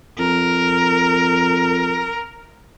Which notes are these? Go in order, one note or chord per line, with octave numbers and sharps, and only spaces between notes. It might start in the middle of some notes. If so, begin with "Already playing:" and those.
F2 A#4